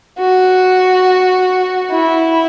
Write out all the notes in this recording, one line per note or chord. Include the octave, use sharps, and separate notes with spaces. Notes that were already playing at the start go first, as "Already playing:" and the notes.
F#4
E4